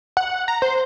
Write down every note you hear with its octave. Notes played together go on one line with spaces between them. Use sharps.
F#5
A#5
C5